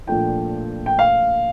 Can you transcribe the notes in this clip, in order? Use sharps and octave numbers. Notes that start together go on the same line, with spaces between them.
A#2 F3 A3 D4 F4 G5
G5
F5